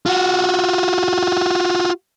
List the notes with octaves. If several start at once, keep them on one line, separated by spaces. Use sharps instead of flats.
F4 F#4